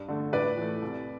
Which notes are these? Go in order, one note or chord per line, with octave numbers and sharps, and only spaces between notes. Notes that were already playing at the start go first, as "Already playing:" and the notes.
Already playing: G2
D3 A3
A2 B4 D5
E3 A3
C2